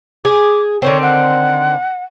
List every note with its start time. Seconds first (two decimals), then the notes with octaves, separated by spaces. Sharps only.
0.25 G#4 D6
0.82 D3 D#3 C4 C#5
1.02 F#5